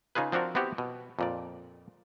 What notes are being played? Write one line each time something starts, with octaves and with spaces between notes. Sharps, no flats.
C#3 D#4 F4 G#4 B4
F3 C4 D4 F#4 A#4
B3 C4 E4 F#4 G4
B2
F2 A#2 D5